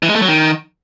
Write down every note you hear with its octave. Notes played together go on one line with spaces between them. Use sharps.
E3
G#3
A3
F#3
D#3